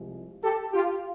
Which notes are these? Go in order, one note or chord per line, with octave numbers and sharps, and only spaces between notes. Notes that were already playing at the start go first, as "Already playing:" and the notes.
Already playing: C2 C3 F3 G#3
G4 A4
F4 G4